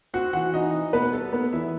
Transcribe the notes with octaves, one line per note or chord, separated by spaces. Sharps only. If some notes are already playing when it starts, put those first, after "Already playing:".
C4 F#4 F#5
E3 F#4 F#5
E3 D#4 D#5
C4
B2 B3 B4
G3 A4
B3 B4
E2 E4 E5